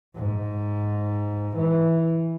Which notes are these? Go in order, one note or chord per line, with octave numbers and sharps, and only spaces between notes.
G#2
E3